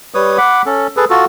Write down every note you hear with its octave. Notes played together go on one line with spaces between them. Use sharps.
G3 B4 C#5 D#6
F#5 B5 D6
C#4 A4
G#4 A4 B4
F4 F#4 A4